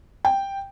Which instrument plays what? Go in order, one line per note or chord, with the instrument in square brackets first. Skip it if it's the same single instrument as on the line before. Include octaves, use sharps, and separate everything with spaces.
[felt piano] G5